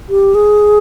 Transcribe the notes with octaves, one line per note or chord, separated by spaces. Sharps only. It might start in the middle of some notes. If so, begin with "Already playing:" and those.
G4
G#4